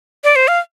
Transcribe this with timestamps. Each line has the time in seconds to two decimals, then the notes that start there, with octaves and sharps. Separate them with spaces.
0.24 D5
0.36 C5
0.48 F5